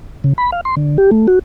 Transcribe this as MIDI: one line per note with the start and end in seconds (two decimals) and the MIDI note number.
0.24 0.33 49
0.38 0.51 83
0.52 0.61 77
0.65 0.75 84
0.77 0.97 50
0.98 1.11 67
1.11 1.27 57
1.28 1.39 66